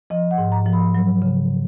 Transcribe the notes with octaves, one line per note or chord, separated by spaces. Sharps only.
F3 D#5
F#5
G#2
A#5
F3
B5
F#3
C#3